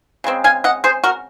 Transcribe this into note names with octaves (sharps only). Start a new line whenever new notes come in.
C#3 G#3 C4
F5 G#5
D#5 F#5
G#4 C5
F#4 A#4